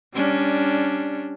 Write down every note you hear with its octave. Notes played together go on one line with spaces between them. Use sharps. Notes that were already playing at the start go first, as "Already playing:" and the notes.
G3 C#4 D4